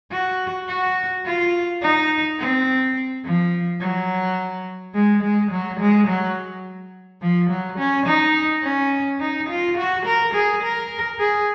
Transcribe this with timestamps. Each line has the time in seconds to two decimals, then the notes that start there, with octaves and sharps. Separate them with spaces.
0.11 F#4
0.68 F#4
1.25 F4
1.82 D#4
2.39 C4
3.24 F3
3.81 F#3
4.95 G#3
5.23 G#3
5.51 F#3
5.80 G#3
6.08 F#3
7.22 F3
7.50 F#3
7.79 C#4
8.07 D#4
8.64 C#4
9.20 D#4
9.49 F4
9.77 F#4
10.06 A#4
10.34 G#4
10.63 A#4
11.19 G#4